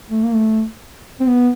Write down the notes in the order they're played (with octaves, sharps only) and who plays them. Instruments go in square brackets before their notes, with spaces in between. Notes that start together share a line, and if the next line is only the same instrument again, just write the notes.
[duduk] A3
A#3
A3
C4
B3